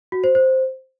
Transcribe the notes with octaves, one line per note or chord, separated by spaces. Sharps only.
F#4
C5
C5